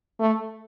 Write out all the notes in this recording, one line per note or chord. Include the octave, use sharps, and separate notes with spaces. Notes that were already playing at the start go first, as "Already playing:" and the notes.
A3